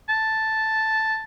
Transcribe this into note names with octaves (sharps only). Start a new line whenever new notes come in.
A5